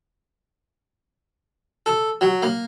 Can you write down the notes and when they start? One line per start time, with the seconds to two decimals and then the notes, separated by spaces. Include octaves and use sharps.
1.86 A4
2.21 F#3
2.42 A#3